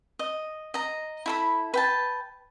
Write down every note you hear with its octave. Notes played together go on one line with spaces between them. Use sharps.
D#5
D#5 A#5
E4 A4 B5
B4 G5 A5